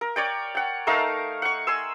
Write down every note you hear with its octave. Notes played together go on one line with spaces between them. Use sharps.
A#4
C#5 D5 G5
F#5 G5
A3 D#4 A#4 F5
F#5 C#6
G#5 C6 E6